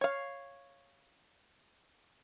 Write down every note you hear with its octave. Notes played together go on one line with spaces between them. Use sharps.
C#5 F5